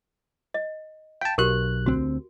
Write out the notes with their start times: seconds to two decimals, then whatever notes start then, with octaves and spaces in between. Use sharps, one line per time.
0.54 D#5
1.21 F5 G5 A5
1.38 B1 F#4 G4 A#4 F#6
1.86 D2 C4 F#4